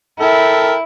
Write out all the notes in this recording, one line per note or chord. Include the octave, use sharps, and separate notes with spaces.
E4 A4 A#4 G5